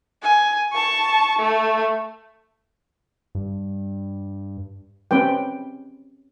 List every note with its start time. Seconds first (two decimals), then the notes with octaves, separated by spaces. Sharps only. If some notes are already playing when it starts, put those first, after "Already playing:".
0.22 G#5
0.73 A5 C#6
1.39 A3
3.35 G2
5.11 C4 C#4 B4 G5